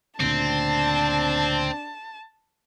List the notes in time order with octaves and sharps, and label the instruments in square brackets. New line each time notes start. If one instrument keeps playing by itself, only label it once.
[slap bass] D2 A#2 C#3 [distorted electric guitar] C4 [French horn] D4 [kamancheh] A5